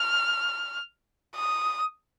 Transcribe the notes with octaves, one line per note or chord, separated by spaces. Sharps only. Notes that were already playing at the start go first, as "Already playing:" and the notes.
Already playing: F6
D#6